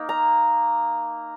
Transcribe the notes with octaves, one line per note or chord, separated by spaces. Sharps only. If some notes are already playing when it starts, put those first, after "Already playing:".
Already playing: A#3 D#4
A#5